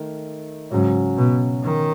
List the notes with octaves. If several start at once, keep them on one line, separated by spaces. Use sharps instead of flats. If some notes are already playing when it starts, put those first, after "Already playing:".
Already playing: D#3 A3
G#2 C#3 F#3 C#4 F#4 C#5
B2
D#3